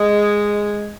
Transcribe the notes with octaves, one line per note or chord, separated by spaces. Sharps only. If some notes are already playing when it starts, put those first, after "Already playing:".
Already playing: G#3